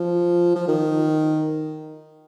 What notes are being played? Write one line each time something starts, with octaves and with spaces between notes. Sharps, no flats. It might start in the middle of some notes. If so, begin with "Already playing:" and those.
Already playing: F3
F3
D#3